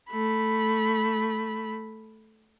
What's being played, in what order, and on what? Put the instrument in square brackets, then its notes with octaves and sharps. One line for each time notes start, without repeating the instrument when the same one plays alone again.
[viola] A3 B5